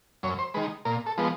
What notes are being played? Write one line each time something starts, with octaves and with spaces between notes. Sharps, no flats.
F#2 C#5
C5
D#3 G#3 B4
A#2 A#4
A4
F3 G#3 B3